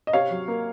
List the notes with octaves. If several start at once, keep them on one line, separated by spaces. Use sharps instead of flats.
D#5
C3 C#5 F5
F#3
A#3